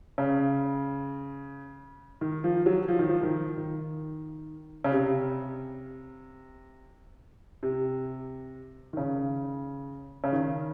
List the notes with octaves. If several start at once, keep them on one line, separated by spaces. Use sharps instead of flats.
C#3
D#3
F3
F#3
F3
D#3
F3
D#3
D#3
C#3
C3
C3
D#3
C#3
C#3
D#3